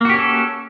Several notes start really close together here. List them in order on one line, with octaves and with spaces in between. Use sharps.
A#3 F#4 G4 C#4 A4